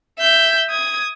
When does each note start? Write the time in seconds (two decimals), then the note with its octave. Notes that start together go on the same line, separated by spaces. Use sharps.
0.19 E5 G6
0.70 D#6 G#6